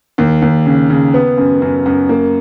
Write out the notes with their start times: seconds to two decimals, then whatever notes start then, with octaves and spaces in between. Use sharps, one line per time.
0.18 D#2
0.42 D#2
0.66 C#3
0.90 C#3
1.14 B3
1.38 F#2
1.62 F#2
1.86 F#2
2.09 A#3